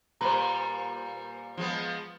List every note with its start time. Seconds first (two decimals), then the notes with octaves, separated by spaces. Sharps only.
0.21 A#2 G3 B4 C5 A#5
1.57 F3 G#3 B3